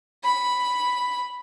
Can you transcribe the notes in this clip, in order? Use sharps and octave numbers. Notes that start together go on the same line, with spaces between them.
B5